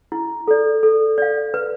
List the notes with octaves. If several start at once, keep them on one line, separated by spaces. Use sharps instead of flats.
E4
A4 D5
A4
D5 F5
B4